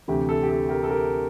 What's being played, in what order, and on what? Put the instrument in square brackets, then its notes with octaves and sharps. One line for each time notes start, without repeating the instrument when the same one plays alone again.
[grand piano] D2 C3 E3 G4
A4
G4
A4
G4 A#4
A4
G4 A#4